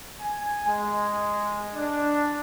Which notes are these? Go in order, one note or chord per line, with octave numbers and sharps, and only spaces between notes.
G#5
G#3
D4